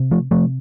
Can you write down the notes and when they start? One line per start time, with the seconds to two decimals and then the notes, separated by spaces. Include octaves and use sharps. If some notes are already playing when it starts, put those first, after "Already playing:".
Already playing: C3
0.11 F3 A3
0.31 C3 F3 A3